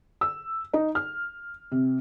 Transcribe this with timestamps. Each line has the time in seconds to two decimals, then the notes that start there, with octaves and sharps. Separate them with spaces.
0.21 E6
0.74 D#4
0.95 F6
1.72 C3